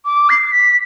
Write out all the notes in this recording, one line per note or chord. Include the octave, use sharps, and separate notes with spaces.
D6
C7
B6